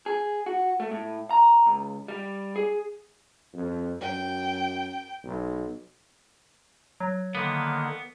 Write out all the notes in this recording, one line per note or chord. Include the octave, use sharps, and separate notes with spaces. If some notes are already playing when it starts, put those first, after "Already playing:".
G#4
F#4
A3
A2
A#5
C#2
G3
G#4
F2
F#2 G5
B1
F#3
D3 D#3 A#3 B3